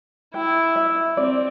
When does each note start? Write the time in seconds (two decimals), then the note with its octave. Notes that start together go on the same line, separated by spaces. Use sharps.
0.34 E4 G5
0.76 E5
1.17 C4 D5